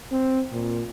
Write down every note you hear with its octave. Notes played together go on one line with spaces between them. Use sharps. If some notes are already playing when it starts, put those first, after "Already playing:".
C4
A#2